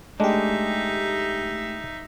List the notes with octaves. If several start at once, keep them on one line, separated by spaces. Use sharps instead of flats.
G#3 A3 D4 D#4 G4 E5